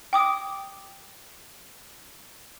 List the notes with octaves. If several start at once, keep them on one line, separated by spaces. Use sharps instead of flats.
G5 D6 D#6